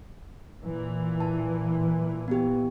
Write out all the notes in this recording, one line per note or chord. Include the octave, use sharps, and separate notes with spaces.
A#2 E3
A5
B3 G4